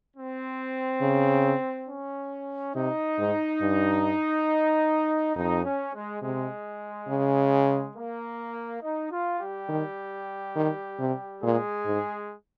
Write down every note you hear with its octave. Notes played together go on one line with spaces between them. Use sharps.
C4
C#3
C#4
C3 D#4
G#2
G2
F2 D#4
C#4
G#3
C3 G#3
C#3
A#3
D#4
F4
G3 G4
D#3
D#3
C3
A#2 G#3 G#4
G#2